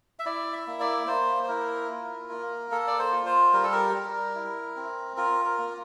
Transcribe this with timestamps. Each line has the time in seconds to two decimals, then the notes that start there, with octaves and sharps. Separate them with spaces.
0.19 E5
0.26 E4 D5
0.53 E5
0.67 A#3
0.80 D5
1.07 A#3 C5
1.43 C5
1.48 E4 A#4
1.89 F4
2.30 A#3
2.71 A#3 A4
2.87 D5
2.99 C5
3.12 F4
3.26 C5
3.53 G3 A#4
3.63 A4
3.72 A#4
3.94 G3
4.35 E4
4.76 C4
5.17 F4 A#4
5.45 A#4
5.58 A#3